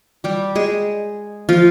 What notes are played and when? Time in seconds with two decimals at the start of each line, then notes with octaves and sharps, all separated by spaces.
0.24 G3 G4
0.55 G#3 G#4
1.49 F3 F4